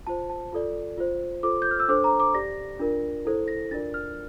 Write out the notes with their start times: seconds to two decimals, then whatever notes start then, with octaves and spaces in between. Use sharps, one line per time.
0.07 F4 C5 A5
0.30 A5
0.53 F4 A4 D5
0.98 F4 C5
1.43 F4 A4 C5 D6
1.62 G6
1.71 F6
1.79 E6
1.88 D4 A4 C5 D6
2.04 A#5
2.20 D6
2.34 G4 D5 A#6
2.79 D4 F4 A#4 D5
3.25 E4 A4 C5
3.48 A#6
3.71 D4 F4 A#4 D5 A6
3.94 F6